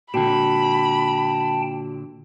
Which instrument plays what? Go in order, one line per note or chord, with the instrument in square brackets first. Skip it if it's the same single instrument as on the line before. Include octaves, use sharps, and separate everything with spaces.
[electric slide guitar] A#2 D3 [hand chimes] F#4 [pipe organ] G5 A5 [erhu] B5